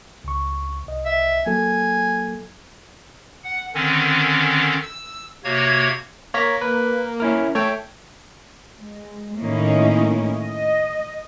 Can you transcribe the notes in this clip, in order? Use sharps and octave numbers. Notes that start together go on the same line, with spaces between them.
C#2 C#6
C2 D#5
E5
F#3 A#3 A4 G#5
F#5
D3 D#3 C4 C#4
E6
C3 A#3 F#4 C#5 G#6
A#3 C#5 A#6 B6
B4
C#4 E4 A#4
A3 C#5 G5
G#3
A2 D#3 A#3 C#4 D#4 E4
D#5